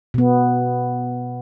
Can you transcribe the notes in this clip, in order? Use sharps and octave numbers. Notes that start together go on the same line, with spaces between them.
B2 B3